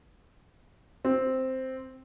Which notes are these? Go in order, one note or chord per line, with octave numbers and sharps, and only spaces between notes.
C4